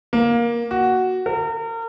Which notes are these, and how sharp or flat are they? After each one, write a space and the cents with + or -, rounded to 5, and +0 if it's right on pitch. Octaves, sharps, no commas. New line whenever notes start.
A#3 +15
F#4 +5
A#4 -35